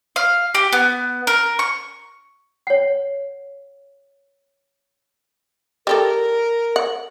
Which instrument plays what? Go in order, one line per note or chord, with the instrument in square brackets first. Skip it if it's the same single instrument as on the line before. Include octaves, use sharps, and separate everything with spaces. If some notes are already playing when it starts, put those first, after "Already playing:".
[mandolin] F5
G4
B3
A#4
C#6
[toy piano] C#5 F#5
[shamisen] G3 G4 A4 [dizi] A#4
[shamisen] F#5